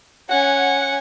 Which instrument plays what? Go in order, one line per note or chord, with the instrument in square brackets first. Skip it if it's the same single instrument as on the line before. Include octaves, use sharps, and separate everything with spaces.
[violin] C#4 G#5 [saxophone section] F#5